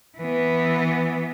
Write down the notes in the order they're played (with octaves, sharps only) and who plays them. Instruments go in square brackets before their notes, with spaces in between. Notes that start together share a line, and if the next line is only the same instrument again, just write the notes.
[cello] E3 B3